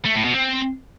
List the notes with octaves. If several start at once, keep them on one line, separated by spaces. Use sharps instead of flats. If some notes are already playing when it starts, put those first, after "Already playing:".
A3
A2
B2
C4